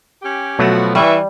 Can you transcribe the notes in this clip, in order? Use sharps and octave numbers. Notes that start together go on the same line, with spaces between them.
C#4 G4
B2 F3 F#3 A3 B3 F#4
E3 G3 E5 C#6